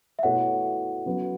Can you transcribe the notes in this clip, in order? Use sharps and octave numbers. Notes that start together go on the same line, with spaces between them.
E5
B2 A3 E4 A4 C#5 F#5
C#3 F#3 B3